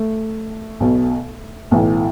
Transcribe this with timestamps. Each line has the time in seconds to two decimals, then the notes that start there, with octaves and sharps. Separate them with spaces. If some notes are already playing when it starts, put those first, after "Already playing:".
Already playing: A3
0.80 B1 B2
1.71 B1 A2 E3